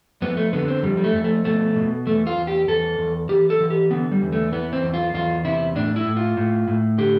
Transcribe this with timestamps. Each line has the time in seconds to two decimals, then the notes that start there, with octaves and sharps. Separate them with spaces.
0.22 F2 B3
0.37 A3
0.53 D3 B3
0.68 C4
0.83 F2 G3
0.97 G3
1.04 A3
1.14 F2
1.24 A3
1.45 B2 A3
1.76 B2
2.07 E2 A3
2.27 F4
2.37 E2
2.47 G4
2.68 E2 A4
2.99 E2
3.29 E3 G4
3.50 A4
3.60 E3
3.70 G4
3.91 D3 B3
4.12 G3
4.22 E2
4.33 A3
4.52 E3 B3
4.73 C4
4.83 E2
4.94 F4
5.14 E2 F4
5.45 C3 E4
5.75 A2 D4
5.96 E4
6.06 A2
6.17 F4
6.37 A2
6.68 A2
6.98 D3 G4